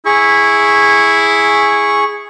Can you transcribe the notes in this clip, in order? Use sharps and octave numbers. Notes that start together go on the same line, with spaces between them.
E4 G#4 C#6